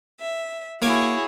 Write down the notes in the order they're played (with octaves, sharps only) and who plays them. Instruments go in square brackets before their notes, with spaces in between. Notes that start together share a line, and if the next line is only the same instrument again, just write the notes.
[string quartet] E5
[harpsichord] A#3 G#5 D6 [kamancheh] E4 C#5 [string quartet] F#4 G#4